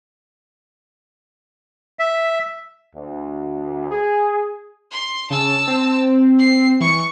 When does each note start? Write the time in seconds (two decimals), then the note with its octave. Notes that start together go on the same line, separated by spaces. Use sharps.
1.99 E5
2.95 D2
3.91 G#4
4.91 C6
5.30 C#3 A5 E6
5.67 C4
6.39 C7
6.81 E3 C#6 C#7